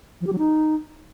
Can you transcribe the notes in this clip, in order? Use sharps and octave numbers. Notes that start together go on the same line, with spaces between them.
F3
G4
F#3
D#4